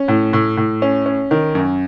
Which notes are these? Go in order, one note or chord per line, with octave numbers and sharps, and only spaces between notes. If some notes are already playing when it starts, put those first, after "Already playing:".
Already playing: C#4
A2
A2
A2
C#4
C#4
D#3
F#2